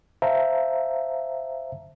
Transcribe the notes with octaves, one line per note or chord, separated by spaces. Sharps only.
C5 E5 F5 A5 A#5